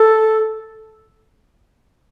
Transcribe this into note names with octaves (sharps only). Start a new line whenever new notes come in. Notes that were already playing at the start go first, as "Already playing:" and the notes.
Already playing: A4